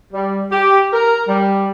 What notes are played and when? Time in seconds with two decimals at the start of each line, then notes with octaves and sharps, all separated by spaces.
0.13 G3
0.51 G4
0.92 A#4
1.28 G3